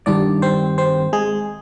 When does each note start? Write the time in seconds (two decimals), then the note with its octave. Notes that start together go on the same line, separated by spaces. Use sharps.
0.06 G2 D#3 G3 D4 D5
0.42 C4 C5
0.78 C4 C5
1.13 G#3 G#4